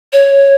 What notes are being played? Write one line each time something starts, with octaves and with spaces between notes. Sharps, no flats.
C#5